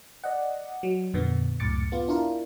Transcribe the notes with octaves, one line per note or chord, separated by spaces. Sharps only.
D5 D#5 F#5
F#3
F2 A#2 D3 B3
C#2 F#2 A2 D6 A6 C#7
B3 F4
D4 E4 F4 A#4